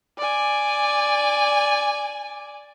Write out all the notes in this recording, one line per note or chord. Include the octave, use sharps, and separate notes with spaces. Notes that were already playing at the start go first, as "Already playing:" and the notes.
D5 G#5